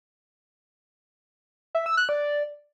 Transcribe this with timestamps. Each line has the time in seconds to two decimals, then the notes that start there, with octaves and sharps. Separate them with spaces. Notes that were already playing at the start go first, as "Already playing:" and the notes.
1.75 E5
1.86 E6
1.97 F#6
2.09 D5